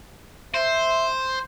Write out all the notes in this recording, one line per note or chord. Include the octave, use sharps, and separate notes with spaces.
C5 E5